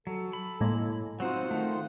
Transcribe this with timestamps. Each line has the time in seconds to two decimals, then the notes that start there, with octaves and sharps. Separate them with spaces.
0.07 F#3 A4
0.33 B5
0.61 A2 G#3 A#3
1.20 F#3 C4 D#4 F4 F#4 C5 F#5
1.51 D#3 A3 D#4